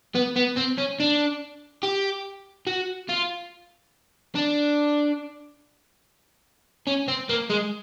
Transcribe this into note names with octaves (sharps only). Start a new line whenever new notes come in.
B3
B3
C4
C#4
D4
G4
F#4
F4
D4
C#4
C4
A#3
G#3